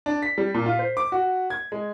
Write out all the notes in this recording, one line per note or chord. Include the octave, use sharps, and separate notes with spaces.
D4
B6
G3
A#2
F4
C5
D6
F#4
G#6
G#3